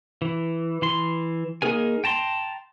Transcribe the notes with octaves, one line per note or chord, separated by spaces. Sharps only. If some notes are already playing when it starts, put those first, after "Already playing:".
E3
E3 C6
A#3 D#4 G#4 A#4 G#5
G5 A5 A#5 C6